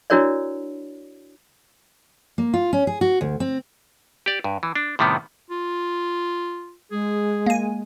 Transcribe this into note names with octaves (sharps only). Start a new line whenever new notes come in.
D4 E4 F#4 A#4 C#5 D5
A#3
F4
C#4
G#4
F#4
D2
C4
G4 D5
G2
E3
D4
A2 C3 D#3 G3 B3
F4
G#3 G#4
A#3 G#5